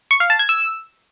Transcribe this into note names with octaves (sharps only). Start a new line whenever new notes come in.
C#6
F5
A5
G#6
E6